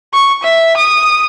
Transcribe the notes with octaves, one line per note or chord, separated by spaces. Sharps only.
C#6
E5
D#6